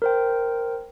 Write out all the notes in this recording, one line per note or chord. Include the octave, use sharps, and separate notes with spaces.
A#4 C5 G5